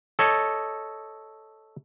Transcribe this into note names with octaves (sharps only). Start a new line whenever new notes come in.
A4 C#5 D#5